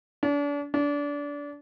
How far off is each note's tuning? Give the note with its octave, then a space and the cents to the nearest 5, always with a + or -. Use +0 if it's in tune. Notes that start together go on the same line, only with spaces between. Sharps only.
D4 -35
D4 -25